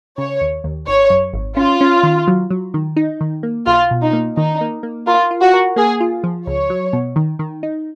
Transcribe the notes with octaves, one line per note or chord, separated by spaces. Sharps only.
C#3 C#5
D#2
D#2
G#1 C#5
F#2
G#1
C#4 F4
C#4
D#3
F#3
F#3
D#3
D#4
D#3
A#3
B1 F4
B2
D#4
A#3
D#3 D#4
A#3
A#3
F4 A#4
F4
F#4
A#4
A#3 G#4
F4
F3
C#2 C#5
F#3
B2
D#3
D#3
D#4